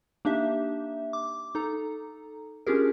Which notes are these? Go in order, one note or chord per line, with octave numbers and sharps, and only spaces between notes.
A#3 D4 D#4 G4 E5
D6
D#4 A4 A#5
C#4 D4 F4 G4 G#4 A#4